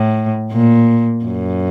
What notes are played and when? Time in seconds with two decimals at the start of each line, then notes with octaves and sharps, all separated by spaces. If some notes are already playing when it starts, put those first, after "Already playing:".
Already playing: A2
0.52 A#2
1.26 F#2